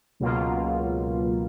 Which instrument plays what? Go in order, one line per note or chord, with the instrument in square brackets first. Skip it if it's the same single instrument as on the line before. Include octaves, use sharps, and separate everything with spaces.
[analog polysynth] C#2 B2 F#3 A#3 F4